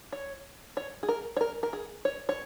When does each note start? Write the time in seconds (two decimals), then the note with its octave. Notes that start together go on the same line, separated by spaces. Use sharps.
0.12 C#5
0.77 C#5
1.03 G#4
1.09 A#4
1.37 C#5
1.41 A#4
1.63 A#4
1.73 G#4
2.05 C#5
2.29 C#5